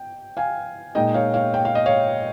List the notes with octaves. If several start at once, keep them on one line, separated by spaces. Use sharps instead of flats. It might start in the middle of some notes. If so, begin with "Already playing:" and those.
Already playing: G5
F5 G#5
A#2 G#3 D#4 D#5 G5
C#5 F5
C#5 F5
G5
F5
D#5
C#5 F5